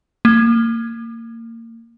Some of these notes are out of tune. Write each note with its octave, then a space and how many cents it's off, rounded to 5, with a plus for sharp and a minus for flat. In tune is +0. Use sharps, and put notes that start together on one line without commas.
A#3 -25